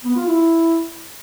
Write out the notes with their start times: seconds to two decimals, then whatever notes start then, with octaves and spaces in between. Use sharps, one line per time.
0.04 B3
0.16 F4
0.28 E4